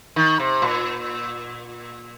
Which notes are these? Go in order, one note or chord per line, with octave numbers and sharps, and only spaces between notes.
D#3
C3
A#2